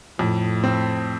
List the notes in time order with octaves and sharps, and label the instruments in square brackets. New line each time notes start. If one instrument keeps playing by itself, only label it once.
[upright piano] F2 [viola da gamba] A2
[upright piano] C4